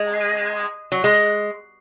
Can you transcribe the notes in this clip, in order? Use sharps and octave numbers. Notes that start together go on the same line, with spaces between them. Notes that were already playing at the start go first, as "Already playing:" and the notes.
Already playing: G#3
F#3
G#3